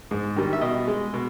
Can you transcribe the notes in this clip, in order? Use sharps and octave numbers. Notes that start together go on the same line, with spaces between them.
G#2
D#3 G3
E5
B2 D#5
G#3
B2